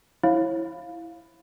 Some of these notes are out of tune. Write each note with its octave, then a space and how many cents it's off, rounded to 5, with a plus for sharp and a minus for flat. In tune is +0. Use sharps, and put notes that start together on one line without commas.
E4 +0 C#5 -40 F5 +5